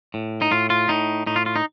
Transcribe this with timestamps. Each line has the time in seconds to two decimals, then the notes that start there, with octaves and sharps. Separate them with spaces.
0.14 A2
0.42 D#4
0.51 A2 F4
0.70 F4
0.89 A2 D#4
1.26 A2 D#4
1.36 F4
1.46 F4
1.56 D#4